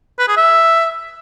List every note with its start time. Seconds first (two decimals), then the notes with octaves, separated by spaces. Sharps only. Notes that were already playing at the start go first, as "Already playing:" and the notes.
0.19 B4
0.28 G#4
0.37 E5